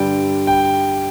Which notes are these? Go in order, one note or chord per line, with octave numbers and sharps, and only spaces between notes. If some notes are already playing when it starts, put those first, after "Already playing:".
Already playing: G2 D3 G3 G5
G5